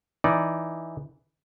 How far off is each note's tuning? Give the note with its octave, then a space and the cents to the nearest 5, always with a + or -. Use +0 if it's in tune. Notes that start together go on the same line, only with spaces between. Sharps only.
E3 +0 D#4 +0 D5 -5